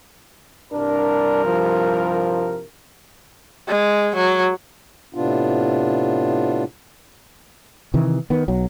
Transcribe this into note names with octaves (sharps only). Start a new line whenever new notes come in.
C2 G2 D4 A#4
F3
G#3
F#3
A2 C3 B3 D4 F4
C3 D#3 E3
D#3 B3
B1 F#3